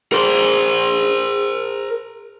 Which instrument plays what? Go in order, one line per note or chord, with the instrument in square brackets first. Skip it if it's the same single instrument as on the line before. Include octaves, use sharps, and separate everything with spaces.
[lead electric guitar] A#4 C5